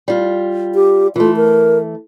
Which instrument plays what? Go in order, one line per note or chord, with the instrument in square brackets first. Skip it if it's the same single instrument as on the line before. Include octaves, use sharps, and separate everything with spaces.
[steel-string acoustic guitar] G3 F4
[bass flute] G4
[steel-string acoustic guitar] E3 A3 [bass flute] F4
[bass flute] A#4